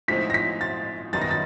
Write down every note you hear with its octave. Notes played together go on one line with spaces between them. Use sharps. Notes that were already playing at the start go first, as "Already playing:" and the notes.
A2 F3 G#3 C4 D#4 B6
A#6
B6
A6
F#2 D#3 G3 B3 D#4 A6
A#6
A6